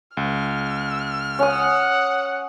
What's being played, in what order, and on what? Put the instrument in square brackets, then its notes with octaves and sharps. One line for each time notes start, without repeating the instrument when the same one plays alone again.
[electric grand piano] C#2 [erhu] F6
[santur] C#4 D#6 [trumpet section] F#5